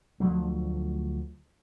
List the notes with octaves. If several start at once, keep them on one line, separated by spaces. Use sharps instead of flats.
D2 F3 F#3 A3